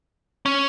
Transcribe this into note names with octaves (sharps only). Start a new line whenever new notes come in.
C#4